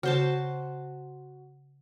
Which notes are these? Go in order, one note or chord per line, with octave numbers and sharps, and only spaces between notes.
C#3 F#4 C5 A5